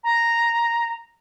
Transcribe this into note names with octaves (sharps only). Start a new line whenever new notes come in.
A#5